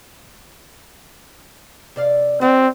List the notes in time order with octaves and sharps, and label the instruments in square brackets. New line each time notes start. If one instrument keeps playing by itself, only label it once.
[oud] C3 D5 F5
[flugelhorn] C4 [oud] F#4 D5